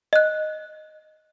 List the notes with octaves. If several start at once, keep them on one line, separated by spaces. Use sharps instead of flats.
D#5 F#6